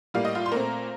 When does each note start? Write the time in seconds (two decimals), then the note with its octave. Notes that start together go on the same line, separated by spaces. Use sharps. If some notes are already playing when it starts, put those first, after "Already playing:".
0.14 A2 G3 A#3 F5
0.25 D#5
0.35 F4 F5
0.46 C6
0.52 A#2 A3 C4 A#4 A#5